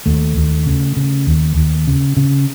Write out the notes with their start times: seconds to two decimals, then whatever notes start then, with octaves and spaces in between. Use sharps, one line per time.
0.06 D#2 A3
0.37 D#2
0.66 C#3
0.97 C#3
1.27 D#2
1.56 D#2
1.87 C#3
2.17 C#3